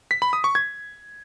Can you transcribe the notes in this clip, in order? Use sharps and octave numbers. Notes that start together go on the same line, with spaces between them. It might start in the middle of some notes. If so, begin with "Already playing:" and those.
B6
B5
D#6
C#6
G#6